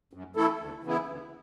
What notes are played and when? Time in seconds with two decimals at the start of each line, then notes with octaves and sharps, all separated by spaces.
0.13 F#2
0.36 E3 A3 E4 A4
0.60 D2
0.84 C#3 E3 B3 E4
1.08 D2